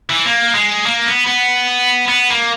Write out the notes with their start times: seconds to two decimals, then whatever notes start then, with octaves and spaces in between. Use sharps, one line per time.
0.10 E3
0.25 A#3
0.55 G#3
0.86 A#3
1.06 B3
1.27 B3
2.09 B3
2.30 A#3